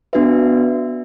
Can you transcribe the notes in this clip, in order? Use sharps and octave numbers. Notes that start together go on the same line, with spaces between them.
B3 D4 F#4 B4 E5